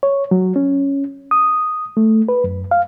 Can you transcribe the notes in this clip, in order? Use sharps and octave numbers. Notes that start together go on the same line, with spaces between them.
C#5
F#3
C#4
D#6
A3
B4
F#2
F5